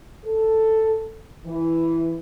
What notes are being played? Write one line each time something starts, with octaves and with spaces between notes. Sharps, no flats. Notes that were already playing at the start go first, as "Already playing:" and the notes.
A4
E3